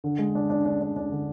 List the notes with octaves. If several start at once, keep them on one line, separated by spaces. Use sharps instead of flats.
D3
G#3
D4
D4
D4
D4
D4
D3